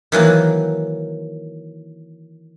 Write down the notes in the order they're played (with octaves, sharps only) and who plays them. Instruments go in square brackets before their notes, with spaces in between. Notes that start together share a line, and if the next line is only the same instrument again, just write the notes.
[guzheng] D#3 E3 F#3 A#3